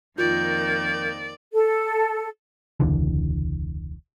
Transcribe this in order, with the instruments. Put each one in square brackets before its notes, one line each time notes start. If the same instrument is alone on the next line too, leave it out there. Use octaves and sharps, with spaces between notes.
[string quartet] F2 D#3 A#3 [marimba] F4 [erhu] D5 [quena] G6
[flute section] A4
[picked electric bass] E1 C#2 D3 E3